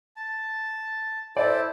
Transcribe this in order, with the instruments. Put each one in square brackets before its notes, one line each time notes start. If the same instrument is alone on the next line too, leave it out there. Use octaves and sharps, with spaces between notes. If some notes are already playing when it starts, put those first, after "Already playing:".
[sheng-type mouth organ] A5
[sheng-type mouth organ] E4 A4 C5 [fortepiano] D5